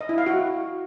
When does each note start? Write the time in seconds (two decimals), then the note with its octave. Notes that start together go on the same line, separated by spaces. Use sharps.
0.01 D#5
0.09 E4
0.18 F5
0.26 F#4